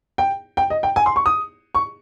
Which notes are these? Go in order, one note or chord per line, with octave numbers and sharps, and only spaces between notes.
G5
G5
D#5
G5
G#5
C6
C#6
D#6
C#6